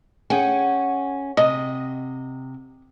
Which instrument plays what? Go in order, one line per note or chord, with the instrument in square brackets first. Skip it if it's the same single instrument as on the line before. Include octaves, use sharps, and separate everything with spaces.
[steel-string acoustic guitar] C#4 [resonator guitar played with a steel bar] G#4 F#5 G5
[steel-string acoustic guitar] C3 [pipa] D#5